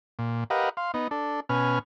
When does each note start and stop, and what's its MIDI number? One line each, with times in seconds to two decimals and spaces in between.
0.19 0.44 46
0.50 0.69 67
0.50 0.69 70
0.50 0.69 71
0.50 0.69 75
0.50 0.69 77
0.50 0.69 78
0.77 0.91 77
0.77 0.91 84
0.94 1.08 59
0.94 1.08 63
1.11 1.40 62
1.11 1.40 69
1.49 1.79 47
1.49 1.79 61
1.49 1.79 71
1.49 1.79 80
1.49 1.79 89